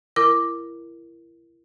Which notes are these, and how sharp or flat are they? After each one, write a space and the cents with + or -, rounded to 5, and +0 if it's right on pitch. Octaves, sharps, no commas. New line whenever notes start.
E4 +30 A#4 +0 D6 +0